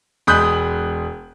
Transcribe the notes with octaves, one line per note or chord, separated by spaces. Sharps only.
E1 G#3 B5 D#6 F#6 G6